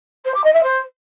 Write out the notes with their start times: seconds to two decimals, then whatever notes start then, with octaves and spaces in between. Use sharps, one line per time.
0.25 C5
0.34 D6
0.44 D#5
0.53 E5
0.63 C5